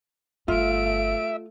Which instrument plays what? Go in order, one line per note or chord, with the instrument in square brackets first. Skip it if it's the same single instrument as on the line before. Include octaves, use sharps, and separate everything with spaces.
[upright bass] G1 G2 [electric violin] A3 D7 [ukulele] F4 [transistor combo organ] E5